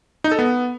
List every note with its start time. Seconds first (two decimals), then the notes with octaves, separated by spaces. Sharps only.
0.24 D#4
0.31 A4
0.39 B3